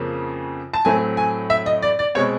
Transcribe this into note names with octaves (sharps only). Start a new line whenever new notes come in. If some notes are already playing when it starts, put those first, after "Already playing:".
Already playing: F2 C#3 F3 A#3 C#4
A5
A2 F#3 A3 C4 G#5
G#5
E5
D#5
D5
D5
B2 G#3 C4 C#5